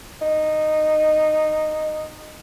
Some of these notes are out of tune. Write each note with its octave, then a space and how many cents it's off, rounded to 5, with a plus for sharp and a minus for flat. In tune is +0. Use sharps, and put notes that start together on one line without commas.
D#4 -10